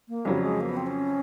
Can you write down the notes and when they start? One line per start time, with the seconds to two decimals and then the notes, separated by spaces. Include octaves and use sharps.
0.09 A#3
0.25 F2 C#3 F#3 G3
0.42 G#3
0.61 A#3
0.69 B3
0.77 C4
0.87 C#4